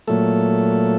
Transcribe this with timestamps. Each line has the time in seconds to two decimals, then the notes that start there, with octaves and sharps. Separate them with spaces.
0.08 A#2 F#3 A3 A4